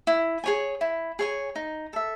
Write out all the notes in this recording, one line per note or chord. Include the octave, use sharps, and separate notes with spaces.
E4
G#4 C#5 G#5
E4
G#4 C#5 G#5
D#4
A4 E5